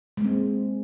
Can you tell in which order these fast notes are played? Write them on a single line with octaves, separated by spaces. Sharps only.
G#3 A#3 C4